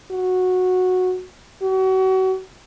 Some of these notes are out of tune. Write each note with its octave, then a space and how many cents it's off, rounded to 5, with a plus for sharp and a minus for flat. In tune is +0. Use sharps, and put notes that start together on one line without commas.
F#4 -10
F#4 +35